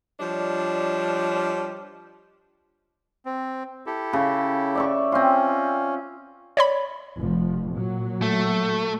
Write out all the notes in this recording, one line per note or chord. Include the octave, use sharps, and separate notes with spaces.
F3 G3 D4 C#5 D#5
C4
E4 G4 A4
C#3
D5 E5 C#6
C4 C#4 F4
C#5 D5 B5
F1 F3
A#2 F#3
A3